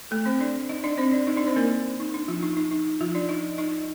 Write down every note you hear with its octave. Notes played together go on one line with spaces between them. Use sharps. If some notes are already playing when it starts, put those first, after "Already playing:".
A3 A4
C4 C5
D4 D5
D#4 D#5
D4 D5
C4 C5
D4 D5
D#4 D#5
D4 D5
C4 C5
A#3 A#4
D#4
D4
F3 F4
D#4
D#4
D#4
F3 F4
D4 D5
D#4 D#5
D#4 D#5